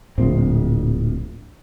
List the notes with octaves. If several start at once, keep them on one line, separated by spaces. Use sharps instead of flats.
D1 A#1 C4